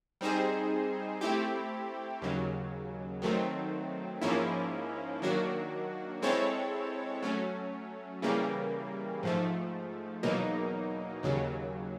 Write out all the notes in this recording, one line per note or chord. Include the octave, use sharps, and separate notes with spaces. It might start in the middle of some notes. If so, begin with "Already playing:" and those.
G3 C4 D#4 G#4 C5
A3 C4 E4 G4
D#2 C#3 F#3
D#3 F#3 A3 C4
G#2 F3 A#3 C#4 E4
D#3 F#3 A#3 D4 F#4
G#3 C4 E4 A4 C#5
F#3 A3 C#4
C#3 E3 G3 A#3
G#2 F3 A3
E2 B2 F#3 A#3 D#4
D#2 C#3 F#3